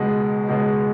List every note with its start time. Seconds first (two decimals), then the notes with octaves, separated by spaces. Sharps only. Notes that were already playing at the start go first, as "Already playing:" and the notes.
Already playing: C#2 B2 G#3
0.48 C#2 B2 G#3